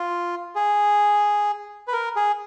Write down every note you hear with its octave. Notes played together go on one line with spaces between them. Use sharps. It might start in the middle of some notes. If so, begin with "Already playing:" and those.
Already playing: F4
G#4
B4
A#4
G#4